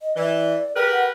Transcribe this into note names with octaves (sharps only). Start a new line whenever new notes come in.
D#5
E3 D5
G4 G#4 A#4 B4
F#5